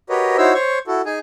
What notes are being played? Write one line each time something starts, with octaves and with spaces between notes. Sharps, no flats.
F#4 G4 A#4 B4 C#5 D#5
D#4 E4 F#4 C5 C#5 E6
C5 C#5 C#6
E4 F#4 A4
D#4 G#4 G#5